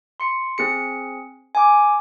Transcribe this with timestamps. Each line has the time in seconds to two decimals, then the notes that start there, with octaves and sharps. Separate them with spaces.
0.20 C6 C#7
0.58 C4 G#4 C#7
1.55 G#5 D6